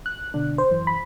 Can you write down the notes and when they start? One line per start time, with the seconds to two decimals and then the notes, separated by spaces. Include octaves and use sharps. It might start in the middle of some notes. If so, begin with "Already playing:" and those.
0.06 F#6
0.34 B2 D3 D4
0.58 C5
0.71 F#2 E3
0.87 B5